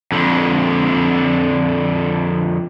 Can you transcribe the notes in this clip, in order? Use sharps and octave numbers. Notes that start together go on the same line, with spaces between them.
F2 D3